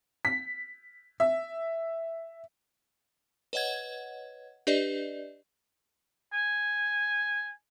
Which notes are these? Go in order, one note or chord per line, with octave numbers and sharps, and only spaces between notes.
B6
E5
B4 C#5 D#5 F#5 G#6
D4 G4 B4 D5 D#5
G#5